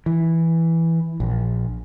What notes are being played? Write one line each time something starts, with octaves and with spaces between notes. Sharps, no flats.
E3
A#1